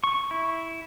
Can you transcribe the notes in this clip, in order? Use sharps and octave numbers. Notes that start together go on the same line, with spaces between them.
C#6
E4